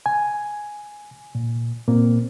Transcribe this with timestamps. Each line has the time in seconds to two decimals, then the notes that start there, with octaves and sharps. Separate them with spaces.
0.06 G#5
1.35 A#2
1.88 A#2 A#3 C4